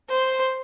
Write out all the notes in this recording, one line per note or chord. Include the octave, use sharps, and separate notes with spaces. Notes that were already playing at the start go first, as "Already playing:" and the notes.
C5